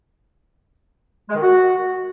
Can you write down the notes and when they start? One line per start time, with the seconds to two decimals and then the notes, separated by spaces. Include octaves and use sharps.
1.29 G#3
1.35 D#3
1.41 F#4